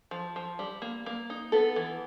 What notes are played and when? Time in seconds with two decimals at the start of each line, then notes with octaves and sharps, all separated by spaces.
0.11 F3
0.36 F3
0.59 G3
0.82 A#3
1.06 A#3
1.30 D#4
1.52 B3 A4
1.76 E3